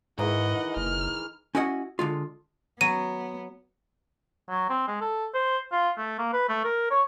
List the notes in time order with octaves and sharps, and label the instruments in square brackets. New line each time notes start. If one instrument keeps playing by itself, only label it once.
[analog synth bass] G#2 [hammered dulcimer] D#3 E3 G#4 [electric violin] D#5 F#5
[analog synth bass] F#1 [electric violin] F6
[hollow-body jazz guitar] C#4 E4 F#4 D#5 F#5
D3 G#3 F4
[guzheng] F#3 [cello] B3 [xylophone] D#7
[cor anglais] F#3
C4
G#3
A4
C5
F4
A3
A#3
B4
A3
A#4
C#5